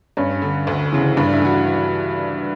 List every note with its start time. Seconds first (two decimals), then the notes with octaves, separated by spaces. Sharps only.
0.17 G2 C#4
0.42 D3
0.67 D2
0.92 C#3 E3
1.17 G2 D4
1.33 E4
1.42 E3 F#4